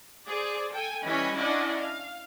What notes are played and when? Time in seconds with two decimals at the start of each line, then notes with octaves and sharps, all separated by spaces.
0.27 G#4 C5 D5
0.72 A4 G5 G#5
1.05 E3 G3 C#4 D#5 B5
1.36 C#4 D4 E4 D5 D#5 F#5
1.81 F5